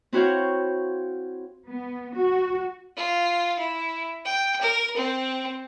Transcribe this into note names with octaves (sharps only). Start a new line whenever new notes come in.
C4 E4 F#4 C#5 F5 G6
B3
F#4
F4
E4
G5
A#4
C4